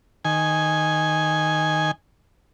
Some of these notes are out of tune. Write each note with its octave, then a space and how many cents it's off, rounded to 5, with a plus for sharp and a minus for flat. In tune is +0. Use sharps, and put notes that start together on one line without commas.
D#3 +0 G#5 +0